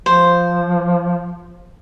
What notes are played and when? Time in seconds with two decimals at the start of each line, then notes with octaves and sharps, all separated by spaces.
0.06 F3 C5